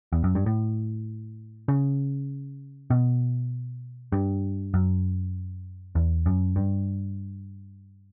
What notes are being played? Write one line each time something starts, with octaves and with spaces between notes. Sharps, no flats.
E2
F#2
G2
A2
C#3
B2
G2
F#2
E2
F#2
G2